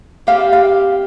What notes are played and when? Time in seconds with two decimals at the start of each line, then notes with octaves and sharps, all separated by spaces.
0.27 G3 C4 G4 F5
0.53 F5